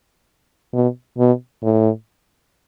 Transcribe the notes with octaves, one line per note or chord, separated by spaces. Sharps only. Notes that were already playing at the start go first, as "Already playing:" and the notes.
B2
B2
A2